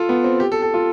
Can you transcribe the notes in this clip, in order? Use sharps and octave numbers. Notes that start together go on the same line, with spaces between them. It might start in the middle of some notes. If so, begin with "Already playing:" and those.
Already playing: F4 A4
B3
C4
G4
A4
A4
F4